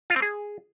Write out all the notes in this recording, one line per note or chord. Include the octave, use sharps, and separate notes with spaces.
F4
C4
G#4